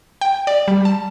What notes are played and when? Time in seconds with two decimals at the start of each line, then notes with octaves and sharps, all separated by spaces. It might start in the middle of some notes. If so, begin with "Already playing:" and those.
0.21 G5
0.47 D5
0.68 G3
0.85 A5